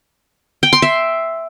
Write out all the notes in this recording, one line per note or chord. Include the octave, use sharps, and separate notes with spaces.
G5
C6
E5